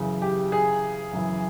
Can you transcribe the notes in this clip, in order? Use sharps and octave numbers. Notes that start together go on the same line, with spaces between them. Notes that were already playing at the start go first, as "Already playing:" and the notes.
Already playing: F#2 C#3 E3
G4
G#4
F#2 C#3 E3